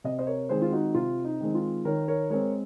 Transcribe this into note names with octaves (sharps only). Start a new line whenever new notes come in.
C3 D#5
C5 D#5
A#4 C#5
D#3 G#3 C4 G#4 C5
F4
D#4 F#4
C3 F4
D#4
D#3 G#3 C4
F4
D#3 A#4 C#5
A#4 C#5
G#3 C4 A#4 C#5